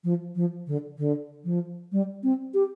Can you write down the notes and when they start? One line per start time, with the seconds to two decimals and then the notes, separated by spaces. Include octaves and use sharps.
0.04 F3
0.35 F3
0.67 D3
0.98 D3
1.44 F3
1.92 G3
2.23 C4
2.54 G4